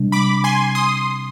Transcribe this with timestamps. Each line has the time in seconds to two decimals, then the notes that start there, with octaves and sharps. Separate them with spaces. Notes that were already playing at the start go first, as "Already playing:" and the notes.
Already playing: C3 G3 D4
0.12 B5 D6
0.44 G#5 C6
0.75 C6 D#6